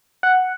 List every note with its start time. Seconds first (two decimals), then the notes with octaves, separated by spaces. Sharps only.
0.23 F#5